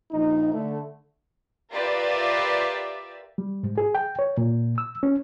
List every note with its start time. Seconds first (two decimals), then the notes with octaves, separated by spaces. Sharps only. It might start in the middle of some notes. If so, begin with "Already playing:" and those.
0.12 A#1 D#4
0.53 D3 A3
1.72 F4 G4 A#4 B4 D5 E5
3.38 G3
3.63 G#2
3.78 G#4
3.95 G5
4.19 C#5
4.37 A#2
4.78 E6
5.03 C#4